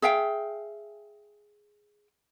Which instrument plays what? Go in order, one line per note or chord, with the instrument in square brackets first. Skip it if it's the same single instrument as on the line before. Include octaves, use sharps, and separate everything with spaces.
[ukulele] G#4 E5 F5 G5